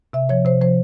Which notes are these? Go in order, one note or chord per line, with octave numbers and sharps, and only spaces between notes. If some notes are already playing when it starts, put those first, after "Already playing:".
C3 E5
F3 C#5
C3 C5
F3 C5